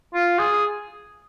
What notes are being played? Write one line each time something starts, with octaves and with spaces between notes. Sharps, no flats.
F4
G#4